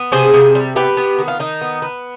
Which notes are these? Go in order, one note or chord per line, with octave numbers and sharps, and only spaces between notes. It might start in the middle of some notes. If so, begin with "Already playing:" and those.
Already playing: B3
C3 G#4 C5
C3
G3
B3 G4 B4
B3
D#3
F4
D#3 D#4
B3
B3